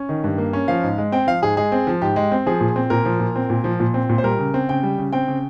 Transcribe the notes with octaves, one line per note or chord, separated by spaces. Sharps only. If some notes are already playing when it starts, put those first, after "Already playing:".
Already playing: C#4
D#3
G2
A#3
C#4
F3 F5
G#2
G#3
C4 G5
F3 F5
G#2 G#4
G#3 G#4
C4
F3
G#2 G4
G#3
C4
F3 G#4
A#2
C4
A#2 A#4
F3
A#2
C4
A#2
F3
A#2
C4
A#2
C5
G3 A#4
C#3
C4
C#3 G5
G3
C#3
C4 G5
C#3